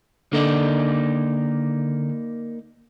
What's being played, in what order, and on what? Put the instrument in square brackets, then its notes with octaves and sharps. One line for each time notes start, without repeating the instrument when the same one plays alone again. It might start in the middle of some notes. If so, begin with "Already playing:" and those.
[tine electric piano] D3 [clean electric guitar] A#3 D#4 D5